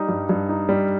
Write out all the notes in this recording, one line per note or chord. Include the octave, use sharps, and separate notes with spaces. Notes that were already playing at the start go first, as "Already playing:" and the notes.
Already playing: G3 D#4
G2
G2
D#4
G3